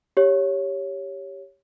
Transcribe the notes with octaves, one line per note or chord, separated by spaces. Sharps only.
G4 C#5